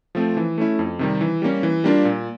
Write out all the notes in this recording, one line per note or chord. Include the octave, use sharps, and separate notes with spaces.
F3 A3 C4
E3
A3 C#4 E4
F2
C3 D#3 G3
E3
G3 A#3 C#4
E3
G3 A#3 D4 F4
A#2